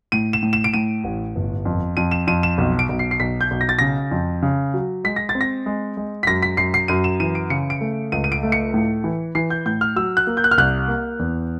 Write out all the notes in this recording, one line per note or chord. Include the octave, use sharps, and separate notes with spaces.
A2 D#7
E7
A2
E7
D7
A2 D#7
A1
G1
F2
F2 D#7
E7
F2 D#7
E7
B1
D7
B1
C7
C7
B1 B6
G6
B1
A#6
A6
C#3 A#6
F2
C#3
F#3
G#3 B6
A#6
A6
C4
A#6
G#3
G#3
B6
F#2 A#6
B6
F#2 C7
C7
F#2 D#7
E7
E3 D#7
D7
C#3 C#7
D7
A3
C#2 D#7
D#7
D7
A3
C#7
A2
E3
E3 C7
G6
A2 G6
F6
F#3 E6
F#6
A#3
G6
F#6
F6
C2 F#6
A#3
E2